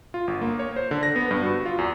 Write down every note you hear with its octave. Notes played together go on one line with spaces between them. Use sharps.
F4
G1
A#3
C#5
C5
D3
A#6
B3
G2
F#4
F4
E2